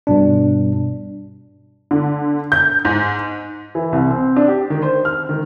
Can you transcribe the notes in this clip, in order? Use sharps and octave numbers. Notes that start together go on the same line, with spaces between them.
G2 B2 D4
D3
G6
G#2
E3
C2
C4
D4
G4
D#3
C5
F6
D#3